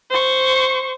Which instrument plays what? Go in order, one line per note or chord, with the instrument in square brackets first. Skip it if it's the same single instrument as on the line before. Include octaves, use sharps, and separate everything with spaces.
[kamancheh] C5 C#6